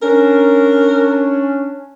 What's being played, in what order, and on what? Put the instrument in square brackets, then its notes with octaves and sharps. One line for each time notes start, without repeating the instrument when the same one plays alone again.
[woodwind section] C#4 D4 [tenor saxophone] A#4